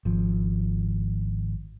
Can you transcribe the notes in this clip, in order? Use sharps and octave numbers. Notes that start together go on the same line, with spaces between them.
G#1 F3